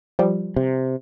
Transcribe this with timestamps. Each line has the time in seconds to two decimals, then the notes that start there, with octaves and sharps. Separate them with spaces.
0.19 F3 G3
0.56 C3